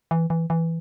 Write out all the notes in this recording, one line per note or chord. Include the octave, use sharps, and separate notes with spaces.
E3
E3
E3